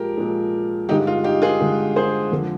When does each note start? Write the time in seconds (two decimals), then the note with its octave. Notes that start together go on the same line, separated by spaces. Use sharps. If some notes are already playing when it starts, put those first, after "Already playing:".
Already playing: A#2 F3 G#3 G4 A#4
0.17 A#2 F3 G#3
0.88 G2 D3 G#3 D#4 G4
1.07 F4
1.24 D#4 G4
1.42 F4 G#4
1.60 G2 D3 G#3
1.96 G#4 C5
2.32 F2 D3 F3 G#3